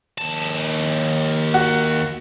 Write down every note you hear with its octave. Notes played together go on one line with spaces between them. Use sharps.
D#2 A5
F#4 F#5